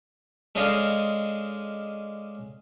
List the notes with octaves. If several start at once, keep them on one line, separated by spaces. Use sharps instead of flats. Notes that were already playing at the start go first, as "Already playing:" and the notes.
G#3 C#4 D4 A4 D#5 F5